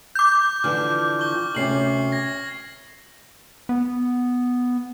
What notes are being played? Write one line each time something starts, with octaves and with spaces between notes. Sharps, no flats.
D6 G6
D3 E3 F3 F6
C#6 G7
D2 C3 C#4 C7 F#7
G#6 A#6
B3